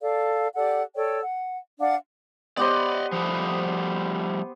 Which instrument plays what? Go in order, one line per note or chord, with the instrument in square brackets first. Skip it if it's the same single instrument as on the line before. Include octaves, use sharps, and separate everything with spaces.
[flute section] A4 D5 F5
G4 A4 D5 F#5
A4 C#5 D5 G5
F#5
D4 D5 F5 F#5
[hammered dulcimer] B3 G4 C5 [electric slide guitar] D5 D#5
[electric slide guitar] F3 G3 A3